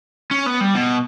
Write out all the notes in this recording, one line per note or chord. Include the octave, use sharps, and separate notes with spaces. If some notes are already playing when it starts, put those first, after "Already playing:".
C#4
B3
G3
B2